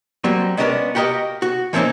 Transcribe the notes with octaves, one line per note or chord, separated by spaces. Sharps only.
F#3 G3 A#3 C4
G#3 B3 C#4 D4 A#4
F#4 G4 A#4 C#5 D#5 F5
F#4
E3 F3 A#3 C4 C#4 D#4